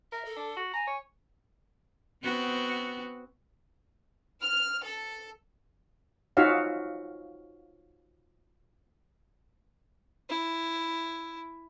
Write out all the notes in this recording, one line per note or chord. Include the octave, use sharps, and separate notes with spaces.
A#4 E5
A4
D4
F#4
G#5 A#5
C#5
B3 C4 F#4
F6
A4
D#4 F4 F#4 C#5 E5 F5
E4